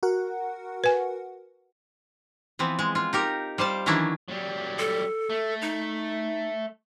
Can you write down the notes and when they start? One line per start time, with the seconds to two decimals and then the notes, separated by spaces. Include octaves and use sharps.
0.03 F#4 A#4 F#5
0.84 B4 G#5
2.59 E3 F3 B3 C4
2.79 G#3
2.95 G#3 F4
3.13 D#4 G4 A#4
3.58 G3 C5 F5 A5
3.86 D#3 E3 F#3 C#4 D4 E4
4.28 F#3 G3
4.79 A4
5.30 A3
5.62 D#4